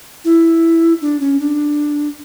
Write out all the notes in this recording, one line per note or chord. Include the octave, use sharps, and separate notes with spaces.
E4
D4
C#4
D4